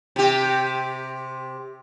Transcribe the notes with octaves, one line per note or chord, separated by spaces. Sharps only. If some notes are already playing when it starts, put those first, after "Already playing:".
C3 G4